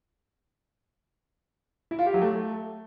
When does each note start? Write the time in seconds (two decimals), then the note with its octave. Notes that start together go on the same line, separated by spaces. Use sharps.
1.91 E4
1.99 F4
2.06 G4
2.14 F#3
2.22 A3